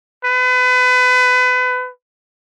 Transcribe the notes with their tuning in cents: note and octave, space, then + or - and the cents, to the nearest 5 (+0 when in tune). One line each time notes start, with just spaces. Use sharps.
B4 +30